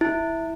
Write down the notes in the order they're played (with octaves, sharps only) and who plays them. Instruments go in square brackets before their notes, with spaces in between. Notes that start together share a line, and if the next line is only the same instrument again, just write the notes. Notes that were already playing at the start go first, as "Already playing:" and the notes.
[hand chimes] E4